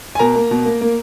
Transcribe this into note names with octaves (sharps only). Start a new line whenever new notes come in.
G#5
B2 A#4 A#5
A#3
B2
A#3
A#3